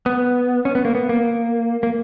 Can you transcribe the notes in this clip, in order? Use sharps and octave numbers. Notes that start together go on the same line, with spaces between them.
B3
C#4
B3
A#3
B3
A#3
A#3